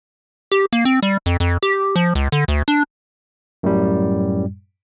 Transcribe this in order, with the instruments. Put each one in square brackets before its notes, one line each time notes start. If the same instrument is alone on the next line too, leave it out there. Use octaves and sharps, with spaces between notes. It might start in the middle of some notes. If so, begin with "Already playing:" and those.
[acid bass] G4
A#3
C4
G3
F2
F2
G4
F3
C#2
D3
D2
D4
[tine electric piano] F#2 A2 G3